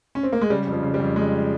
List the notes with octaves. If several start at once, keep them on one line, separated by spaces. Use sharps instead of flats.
C#4
C4
A#3
G#3
C#3 G3
F2
F3
C#3
G3
F2
C#3 G#3